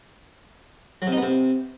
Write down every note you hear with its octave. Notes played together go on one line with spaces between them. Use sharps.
F#3
C3
D#4
B3
C3